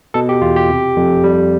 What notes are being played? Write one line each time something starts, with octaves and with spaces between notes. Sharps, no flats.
B2 A4
G4
E2 F4
G4
C3
F2
G3